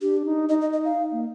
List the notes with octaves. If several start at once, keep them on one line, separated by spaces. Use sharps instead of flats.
D4 G4
D#4
D#4 D#5
D#5
D#5
F5
A#3